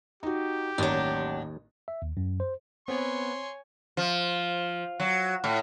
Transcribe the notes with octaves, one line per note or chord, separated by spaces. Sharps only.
D#4 F#4 G4
A1 D#2 F#3 D4 D#4
E5
D#2
F#2
C5
B3 C4 C#5 G#5 C6
F3
F#3
A2